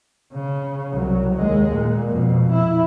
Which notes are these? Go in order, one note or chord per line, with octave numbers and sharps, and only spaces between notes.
C#3
C2 F#3
D#2 G#3
A#2
F2 B2
E4